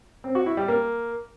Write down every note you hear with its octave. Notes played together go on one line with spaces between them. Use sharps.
C4
F#4
E4
G3
A#3